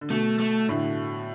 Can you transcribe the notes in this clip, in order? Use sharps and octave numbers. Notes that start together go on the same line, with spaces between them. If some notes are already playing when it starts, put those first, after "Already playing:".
D3
B2 A3
A3
A2 D3